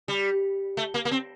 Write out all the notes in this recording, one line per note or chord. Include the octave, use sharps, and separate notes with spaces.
G3
A3
A#3
A#3
C4